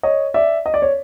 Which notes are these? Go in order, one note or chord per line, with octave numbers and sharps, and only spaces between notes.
C#5 D#5
D5 E5
D#5
D5
C#5